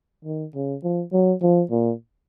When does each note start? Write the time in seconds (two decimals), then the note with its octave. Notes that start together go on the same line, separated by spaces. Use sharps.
0.25 D#3
0.55 C#3
0.83 F3
1.13 F#3
1.42 F3
1.71 A#2